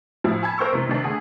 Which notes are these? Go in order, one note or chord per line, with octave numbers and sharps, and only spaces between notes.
A2 F3 E4 F4
G#5 A5 B5 G#6
A#4 C5 C6 C#6 E6
C3 E3
C3 D#3 D4
D3 A3 G#4